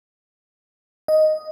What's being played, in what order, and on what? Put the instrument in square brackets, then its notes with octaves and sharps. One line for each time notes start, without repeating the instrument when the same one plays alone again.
[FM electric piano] D#5